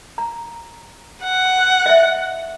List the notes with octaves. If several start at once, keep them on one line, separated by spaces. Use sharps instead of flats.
A#5
F#5
D#5 E5